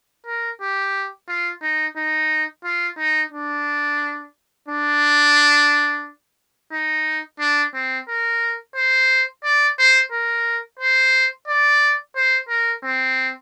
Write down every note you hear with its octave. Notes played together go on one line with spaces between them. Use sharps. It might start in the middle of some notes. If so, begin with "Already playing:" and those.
A#4
G4
F4
D#4
D#4
F4
D#4
D4
D4
D#4
D4
C4
A#4
C5
D5
C5
A#4
C5
D5
C5
A#4
C4